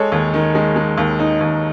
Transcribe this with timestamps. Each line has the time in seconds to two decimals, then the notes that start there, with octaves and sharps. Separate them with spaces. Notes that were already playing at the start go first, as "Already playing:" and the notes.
Already playing: G#3 A4 C#5
0.12 D#2
0.34 D#3
0.55 G#3
0.76 G#3
0.98 D#2
1.19 D#4
1.41 D#2